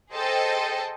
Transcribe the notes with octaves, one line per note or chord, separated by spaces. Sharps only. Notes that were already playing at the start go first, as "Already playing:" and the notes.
G#4 A4 C5 D#5 G5 A5